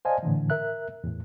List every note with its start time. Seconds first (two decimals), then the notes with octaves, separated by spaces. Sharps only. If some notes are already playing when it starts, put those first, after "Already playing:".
0.05 C5 D5 D#5 F5 G#5 A5
0.23 A2 D3 E3
0.50 A#4 E5 F#6
1.04 E2 A2